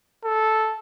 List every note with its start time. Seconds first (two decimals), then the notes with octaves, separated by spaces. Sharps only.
0.25 A4